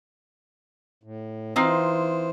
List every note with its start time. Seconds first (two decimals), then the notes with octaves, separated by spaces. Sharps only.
1.03 A2
1.56 E3 C4 D#4 F4 C5